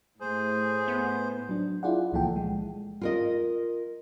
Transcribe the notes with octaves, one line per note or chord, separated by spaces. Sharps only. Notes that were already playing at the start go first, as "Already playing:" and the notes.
A2 G#4 C5
B3
F#3 D4
E4 F4 G#4 D5 F#5
C#2 A#2 E3 F3 A4 G5
G#3
F4 A#4 D#5